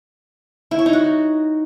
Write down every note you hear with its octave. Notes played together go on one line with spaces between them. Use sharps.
E4
C#5
D#4
F#4